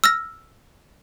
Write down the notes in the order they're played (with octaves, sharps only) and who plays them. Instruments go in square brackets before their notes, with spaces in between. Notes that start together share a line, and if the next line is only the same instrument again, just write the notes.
[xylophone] E6 F6 A#6